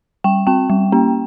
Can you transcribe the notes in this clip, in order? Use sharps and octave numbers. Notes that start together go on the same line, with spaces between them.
G3 G5
C4 G5
G3
A#3 C#4